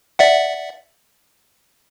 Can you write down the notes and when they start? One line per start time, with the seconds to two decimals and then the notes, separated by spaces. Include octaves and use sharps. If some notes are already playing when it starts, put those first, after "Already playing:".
0.19 D5 E5 F#5